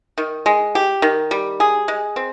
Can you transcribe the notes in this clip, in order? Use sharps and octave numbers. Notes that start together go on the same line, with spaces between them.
D#3
G#3
G4
D#3
G3
G#4
G#3
C4